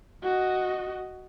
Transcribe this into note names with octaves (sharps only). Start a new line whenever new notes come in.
F#4 D#5